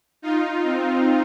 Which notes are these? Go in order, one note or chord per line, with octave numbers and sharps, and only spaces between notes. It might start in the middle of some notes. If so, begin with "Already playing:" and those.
D#4 F4
C4